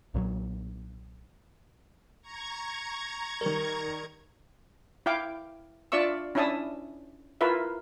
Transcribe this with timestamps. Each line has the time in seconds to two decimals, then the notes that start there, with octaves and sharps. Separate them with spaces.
0.14 B1 A#2 F3 F#3
2.22 A#5 C#6 G#6
3.41 D#3 G3 A#4
5.06 E4 F5 G5 D6
5.92 D4 F4 D5 E5 C#6 E6
6.35 C#4 D4 E4 E5 A5 D#6
7.41 E4 F4 A#4 B4 E5